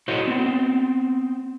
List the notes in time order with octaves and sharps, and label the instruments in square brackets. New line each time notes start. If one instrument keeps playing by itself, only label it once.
[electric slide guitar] E4 F#4 A4 C5 C#5 D#5
B3 C4